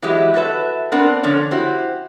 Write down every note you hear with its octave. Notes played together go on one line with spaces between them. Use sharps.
E3 F#3 G#3 E4 G4
F#4 A4 B4 E5
B3 C4 D4 A#4 F#5
D3 F3 C#4 C#5
E4 F#4 G4 C5